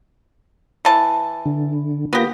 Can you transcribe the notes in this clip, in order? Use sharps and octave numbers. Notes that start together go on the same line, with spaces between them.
E3 A5
D3
A#3 B3 F4 G4 A#6